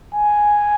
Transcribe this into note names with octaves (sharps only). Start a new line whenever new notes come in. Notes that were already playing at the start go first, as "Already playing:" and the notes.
G#5